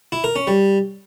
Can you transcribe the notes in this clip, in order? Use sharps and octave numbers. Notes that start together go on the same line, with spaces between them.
E4
A#4
C#4
G3